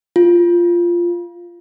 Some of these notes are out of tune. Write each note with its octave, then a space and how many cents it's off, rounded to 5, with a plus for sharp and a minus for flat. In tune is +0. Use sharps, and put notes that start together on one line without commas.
F4 -10